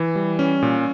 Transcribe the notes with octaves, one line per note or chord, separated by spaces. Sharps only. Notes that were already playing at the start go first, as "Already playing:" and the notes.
Already playing: E3
G3
C#4
A#2